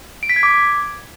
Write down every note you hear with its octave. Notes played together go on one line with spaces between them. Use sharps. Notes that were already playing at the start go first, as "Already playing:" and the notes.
D7
B6
G#6
D6